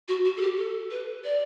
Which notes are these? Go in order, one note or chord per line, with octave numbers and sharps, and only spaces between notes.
F#4
F#4
A4
G4
A4
B4
D5